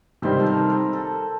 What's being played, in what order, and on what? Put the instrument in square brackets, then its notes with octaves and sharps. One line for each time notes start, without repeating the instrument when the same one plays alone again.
[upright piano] C3 D#3 G3 C4 G4 [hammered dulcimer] C5
[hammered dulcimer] A4
A#4
A#4
A4